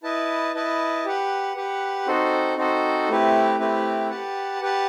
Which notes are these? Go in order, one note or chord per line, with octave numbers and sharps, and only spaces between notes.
E4 B4 D#5 A5
E4 B4 D#5 A5
G4 B4 F#5
G4 B4 F#5
C4 D#4 F#4 A4 C5
C4 D#4 F#4 A4 C5
A3 C4 E4 G4 B4
A3 C4 E4 G4 B4
G4 B4 F#5 A5
G4 B4 F#5 A5